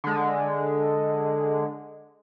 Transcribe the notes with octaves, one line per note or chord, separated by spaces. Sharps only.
D3 G#3